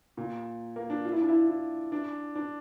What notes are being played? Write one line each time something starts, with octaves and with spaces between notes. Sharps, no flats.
A#2
A#3
D4
F4
E4
D4
E4
E4
D4
D4